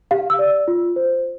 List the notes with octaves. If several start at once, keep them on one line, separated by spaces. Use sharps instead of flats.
G4 F5
E6
D5
F4
C5